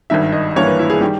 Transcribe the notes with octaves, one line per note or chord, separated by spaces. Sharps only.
G#1 G2 D#3 E5
D#5
G#1 G2 E3 A#3 C#5
B4
E4
G#4
D#3 G3 G4